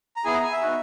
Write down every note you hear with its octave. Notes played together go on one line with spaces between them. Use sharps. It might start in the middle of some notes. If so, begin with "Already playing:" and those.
A#5
B3 E4 G#4 G#5
A#5
G#5
E5
B3 D#4 F#4